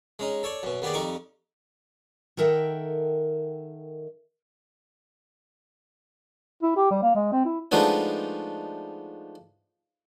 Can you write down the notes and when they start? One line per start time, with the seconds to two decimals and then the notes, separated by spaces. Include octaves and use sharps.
0.19 G#3 C#4 D#4
0.43 A4 C#5 D5
0.63 F#2 B2
0.82 D#2 B3 G4 G#4 D5
0.94 F2 G3 D#4 C#6 D6
2.37 D#3 A4 A#4 E5 F#5 G5
6.63 E4
6.77 G4
6.91 G3
7.03 A#3
7.15 G#3
7.32 C4
7.45 E4
7.72 F3 G#3 A3 B3 D4 D#4